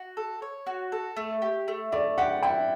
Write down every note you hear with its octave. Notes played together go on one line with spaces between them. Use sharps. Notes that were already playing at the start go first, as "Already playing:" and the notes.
Already playing: F#4
A4
C#5
F#4
A4
A3
G4
A3
A3 D5
G4 F#5
E4 G5